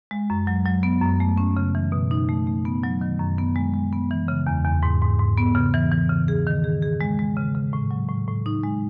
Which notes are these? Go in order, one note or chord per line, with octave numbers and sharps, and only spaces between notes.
G#3
F#2
F#3
F#3
B3
F#2
A3
C#4
C#3
E3
B2
D#4
A3
A3
B3
F#3
D#3
F#2
B3
G#3
G#3
B3
E3
C#3
E2
E2
G#2
G#2
G#2
B3
C#3
E3
E3
C#3
G#4
D#3
G#4
G#4
G#3
G#3
C#3
C#3
A2
F#3
A2
A2
D#4
G#3